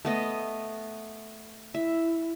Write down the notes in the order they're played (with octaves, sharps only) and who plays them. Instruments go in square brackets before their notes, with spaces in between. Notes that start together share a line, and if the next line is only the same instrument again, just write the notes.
[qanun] A3 B3 D#5
[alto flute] E4 [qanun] E5